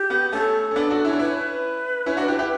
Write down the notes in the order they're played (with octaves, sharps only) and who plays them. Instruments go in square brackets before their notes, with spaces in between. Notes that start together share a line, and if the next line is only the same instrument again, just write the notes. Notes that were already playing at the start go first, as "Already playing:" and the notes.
Already playing: [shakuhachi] G4
[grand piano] B3
[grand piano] A3 C#4 [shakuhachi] A4
[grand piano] C#4
B3 D4
D4 F#4
C#4 E4
D4
[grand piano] C#4 E4 [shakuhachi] B4
[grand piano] C#4 E4
D4 F#4
E4 G4
E4 G4